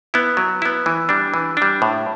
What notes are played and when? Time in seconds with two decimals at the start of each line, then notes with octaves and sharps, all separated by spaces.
0.14 B3 E4
0.37 F#3
0.62 B3 E4
0.86 E3
1.09 G3 D4
1.34 E3
1.57 G3 D4
1.82 A2